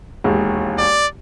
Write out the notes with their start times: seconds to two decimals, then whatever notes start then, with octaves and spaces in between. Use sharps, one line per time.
0.24 E1 D#2
0.78 D5